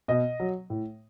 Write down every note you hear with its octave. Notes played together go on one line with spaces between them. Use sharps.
B2 D#5
F#3
A2